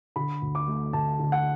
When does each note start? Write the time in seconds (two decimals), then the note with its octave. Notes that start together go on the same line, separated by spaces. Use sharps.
0.16 D3 B5
0.42 D2
0.55 D6
0.68 A3
0.93 D2 A5
1.19 D3
1.32 F#5